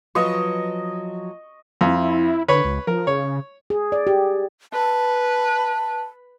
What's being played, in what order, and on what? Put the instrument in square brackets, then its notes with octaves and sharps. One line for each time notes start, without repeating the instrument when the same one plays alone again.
[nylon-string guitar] F3 F#3 B4 [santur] D#5 C#6
[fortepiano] F2 [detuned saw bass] E4
[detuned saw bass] D3 [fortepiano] B4 C#5
[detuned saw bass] C#2
[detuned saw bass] F3 [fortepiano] A#4
[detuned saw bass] C#3 [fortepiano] C#5
[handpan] G#4
D5
G4
[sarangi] B4 [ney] A5